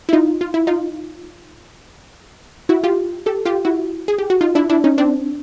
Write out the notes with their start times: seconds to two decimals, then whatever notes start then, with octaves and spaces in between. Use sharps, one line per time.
0.09 E4
0.13 D#4 F4
0.41 F4
0.54 E4
0.67 D#4 F4
2.69 E4 F#4
2.83 F4 G4
3.26 G4 A4
3.45 F4 G4
3.65 E4 F#4
4.08 G#4
4.18 G4
4.30 F#4
4.41 D#4 F4
4.55 D4 E4
4.70 D4 E4
4.84 C#4 D#4
4.98 C4 D4